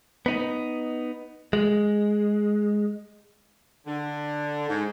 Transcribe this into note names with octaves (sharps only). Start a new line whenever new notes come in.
B3 D#4
G#3
D3
G#2